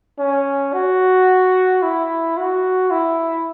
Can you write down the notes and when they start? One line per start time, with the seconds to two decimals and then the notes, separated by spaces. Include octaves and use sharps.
0.19 C#4
0.73 F#4
1.83 E4
2.37 F#4
2.91 E4